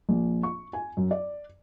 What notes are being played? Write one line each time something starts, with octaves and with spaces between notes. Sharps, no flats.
A#1
C#6
G#5
F#2
D5